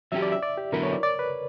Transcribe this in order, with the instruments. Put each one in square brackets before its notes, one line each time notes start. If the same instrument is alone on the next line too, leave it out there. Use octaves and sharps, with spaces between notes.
[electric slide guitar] F#3 C#4 G4 [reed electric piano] E5
[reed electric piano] D5
E5
D5
G4
[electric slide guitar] D3 F#3 B3 E4 [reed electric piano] A#4
[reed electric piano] C#5
D5
D5
B4